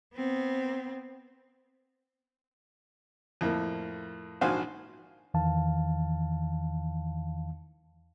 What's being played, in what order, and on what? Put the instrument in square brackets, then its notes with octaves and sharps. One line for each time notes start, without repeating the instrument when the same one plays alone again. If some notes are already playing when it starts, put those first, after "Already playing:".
[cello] B3 C4
[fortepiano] F2 A2 A#3
A#1 G#2 F#4 C5 F5 G#5
[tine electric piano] E2 D#3 E3 F5 A5